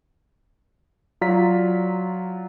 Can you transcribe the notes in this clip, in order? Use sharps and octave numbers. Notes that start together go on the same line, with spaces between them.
F#3 F4 D5 A#5 B6